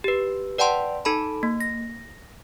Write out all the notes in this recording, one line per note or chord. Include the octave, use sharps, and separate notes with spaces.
G4 B4
B4 D5 F#5 G5 A5 C6
D#4 A4 A5 B5
A#3
A#6